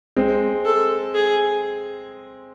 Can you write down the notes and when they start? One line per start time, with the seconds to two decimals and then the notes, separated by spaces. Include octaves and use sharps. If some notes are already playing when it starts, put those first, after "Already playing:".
0.16 G#3 C4
0.65 A4
1.15 G#4